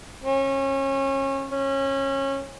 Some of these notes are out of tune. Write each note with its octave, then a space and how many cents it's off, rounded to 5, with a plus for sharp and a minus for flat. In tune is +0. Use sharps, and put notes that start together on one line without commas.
C#4 -30
C#4 -25